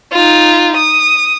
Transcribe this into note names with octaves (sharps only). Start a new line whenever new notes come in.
D#4 F4
D#6